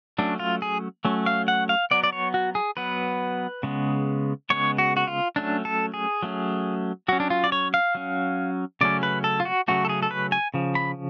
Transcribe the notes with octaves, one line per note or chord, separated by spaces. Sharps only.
F#3 A3 C#4 D4
F4
G#4
F#3 A3 C#4
F5
F#5
F5
F#3 B3 D5
D5
C#5
F#4
G#4
F#3 B3 B4
C#3 G#3 B3
C#3 G#3 B3 C#5
F#4
F#4
F4
F#3 A3 C#4 D4
A4
G#4
F#3 A3 C#4
F#3 C#4 F#4
D4
F4
D5
C#5
F5
F#3 C#4
C#3 F#3 A3 C#4 D5
B4
A4
F4
F#4
C#3 F#3 A3 C#4 F#4
A4
G#4
A4
B4
G#5
C#3 F3
B5